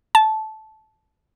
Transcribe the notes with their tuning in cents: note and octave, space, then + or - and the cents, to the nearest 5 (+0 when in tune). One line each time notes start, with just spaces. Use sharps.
A5 -15